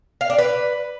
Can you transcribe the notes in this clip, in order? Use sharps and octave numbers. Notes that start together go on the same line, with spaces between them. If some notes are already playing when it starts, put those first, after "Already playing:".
F5
D4
B4